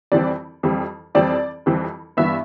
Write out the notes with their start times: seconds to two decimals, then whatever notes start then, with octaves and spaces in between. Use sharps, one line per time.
0.12 F2 E3 G3 C4 D5
0.63 F2 E3 G3 C4
1.15 F2 E3 G3 C4 D5
1.66 F2 E3 G3 C4
2.17 G2 E3 B3 E5